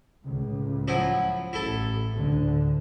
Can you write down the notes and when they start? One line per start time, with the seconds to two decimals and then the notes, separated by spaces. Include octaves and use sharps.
0.21 C#2 A2
0.88 F3 F#3 E4
1.53 A1 E4 A4
2.16 D2 A2 D3